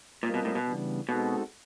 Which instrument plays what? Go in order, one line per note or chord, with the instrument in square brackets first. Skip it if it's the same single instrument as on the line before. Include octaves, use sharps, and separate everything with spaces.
[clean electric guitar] A#2 [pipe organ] G3 C4 F4 A#4 D#5
[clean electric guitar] B2
A2
B2
[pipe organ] C#3 E3 G3 B3 D4
[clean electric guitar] B2 [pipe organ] G#3 C4 D#4 F#4 A4